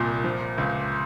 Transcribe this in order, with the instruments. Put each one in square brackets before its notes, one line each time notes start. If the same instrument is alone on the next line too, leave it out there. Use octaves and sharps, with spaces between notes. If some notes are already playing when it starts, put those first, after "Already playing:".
Already playing: [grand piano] C2 A#2
F3
C#2